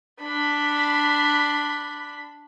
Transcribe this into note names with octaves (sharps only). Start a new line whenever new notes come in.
D4 B5